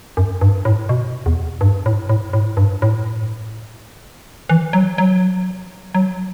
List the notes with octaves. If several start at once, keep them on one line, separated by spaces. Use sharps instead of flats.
F#2
G2
A2
B2
E2
G2
A2
A2
A2
G2
A2
E3
F#3
F#3
F#3